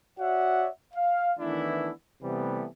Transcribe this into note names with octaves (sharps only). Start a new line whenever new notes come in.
F#4 C#5 D5 E5 F#5
F5
D#3 E3 A3 B3 D4 E4
C3 E3 G3 A3 B3